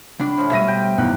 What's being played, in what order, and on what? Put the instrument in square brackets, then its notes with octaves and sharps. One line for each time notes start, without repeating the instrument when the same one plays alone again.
[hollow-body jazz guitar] C#2 D4 [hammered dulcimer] B5
[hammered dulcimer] A2 F3
[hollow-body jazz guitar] B2 G3 [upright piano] E5 A#6 D#7
[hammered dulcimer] G5
[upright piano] B1 E2 F#6 [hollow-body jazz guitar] B3